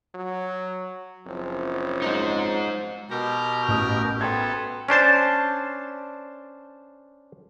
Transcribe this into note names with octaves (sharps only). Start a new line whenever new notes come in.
F#3
F#1 F3 C4 C#4
G#3 D#4
B2 G4 A#4 A#5
A1 D#6
B3 A4 G5 C6 G#6
C#4 D4 C5 A5